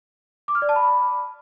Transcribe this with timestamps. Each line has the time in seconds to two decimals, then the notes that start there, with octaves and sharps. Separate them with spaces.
0.48 D6
0.55 F6
0.62 D5
0.69 A5
0.76 B5